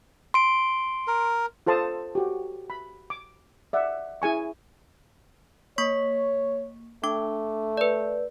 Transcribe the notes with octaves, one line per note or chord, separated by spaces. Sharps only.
C6 D7
A#4
F4 A4 C5 A5 C6 D#6
F#4 G4
B5
D6
D5 E5 F#5
E4 G#4 G#5 C#6
A#3 C#5 C#6 B6
A3 D4 D6
B4 D5